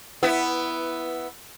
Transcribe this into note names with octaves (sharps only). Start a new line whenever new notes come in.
B3 E4